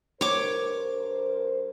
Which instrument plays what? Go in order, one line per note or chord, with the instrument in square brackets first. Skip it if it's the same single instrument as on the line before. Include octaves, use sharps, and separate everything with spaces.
[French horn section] G2 A#4 C5 [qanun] C#5 D6